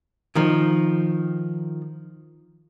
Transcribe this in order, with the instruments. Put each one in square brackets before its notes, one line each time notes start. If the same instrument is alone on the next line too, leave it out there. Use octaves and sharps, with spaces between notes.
[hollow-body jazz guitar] D#3 F3